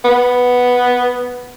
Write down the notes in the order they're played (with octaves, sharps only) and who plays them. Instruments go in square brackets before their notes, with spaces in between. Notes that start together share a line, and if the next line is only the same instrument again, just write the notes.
[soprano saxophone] B3